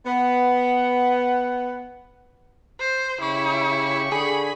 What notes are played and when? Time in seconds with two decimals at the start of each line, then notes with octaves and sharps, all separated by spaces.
0.06 B3 F#5
2.80 C5
3.21 C#3 E4 G4 C#6
4.12 D3 G#4 B5